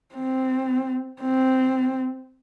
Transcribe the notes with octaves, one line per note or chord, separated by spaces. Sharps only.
C4
C4